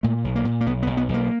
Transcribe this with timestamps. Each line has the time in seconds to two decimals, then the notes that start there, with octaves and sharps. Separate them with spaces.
0.03 A#2 A3
0.24 B1
0.35 A#3
0.45 A#2
0.61 A#3
0.66 B1 B3
0.83 B3
0.87 B1
0.97 B3
1.09 B1
1.14 A#3